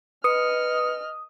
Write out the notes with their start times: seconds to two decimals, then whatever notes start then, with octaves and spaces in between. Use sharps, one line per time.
0.24 B4 D#5 D#6 F6 C#7